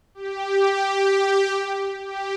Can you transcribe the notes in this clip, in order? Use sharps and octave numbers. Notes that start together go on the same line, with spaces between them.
G4
G4